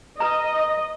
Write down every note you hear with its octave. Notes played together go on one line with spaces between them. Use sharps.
B4 D#5 A#5